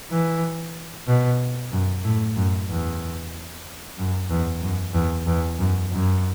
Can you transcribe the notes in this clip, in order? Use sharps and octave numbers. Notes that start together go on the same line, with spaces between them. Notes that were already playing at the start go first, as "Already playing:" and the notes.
E3
B2
F#2
A2
F#2
E2
F#2
E2
F#2
E2
E2
F#2
F#2